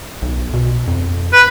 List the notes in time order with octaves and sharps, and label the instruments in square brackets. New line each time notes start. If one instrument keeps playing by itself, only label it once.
[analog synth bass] B1
B2
F2
[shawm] B4